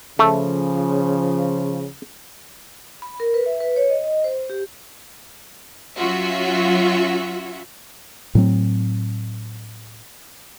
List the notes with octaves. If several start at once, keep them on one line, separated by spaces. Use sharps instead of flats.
C#3 F3 A3
B5
A#4
B4
E5
B4
C#5
D#5
D#5
C5
G4
F#3 C#4 F4 F#4 E5
A2 F#3 C4